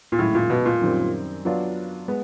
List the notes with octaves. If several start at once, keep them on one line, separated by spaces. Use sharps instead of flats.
A#2
F#2 A2 D#3 G#3
A#2
B2
A#2
F#2 D#3 G3 C4
F#3 B3 D4 F4
G#3 B3